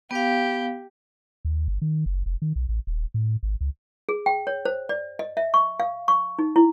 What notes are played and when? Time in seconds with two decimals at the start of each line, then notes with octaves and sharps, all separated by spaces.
0.11 B3 G4 F5
1.45 D#2
1.68 G1
1.82 D#3
2.06 F#1
2.26 F1
2.42 D#3
2.56 B1
2.69 A1
2.87 D#1
3.14 A2
3.43 G#1
3.61 C#2
4.09 G#4
4.26 G5
4.47 C#5
4.65 C5
4.89 D5
5.19 D#5
5.37 E5
5.54 C#6
5.80 F5
6.08 C#6
6.39 D#4
6.56 E4